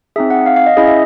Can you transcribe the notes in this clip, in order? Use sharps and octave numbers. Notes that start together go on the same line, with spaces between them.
C4 D#4 G#4 E5
F#5
F5
F5
D#5
C#4 E4 G#4 D#5
E5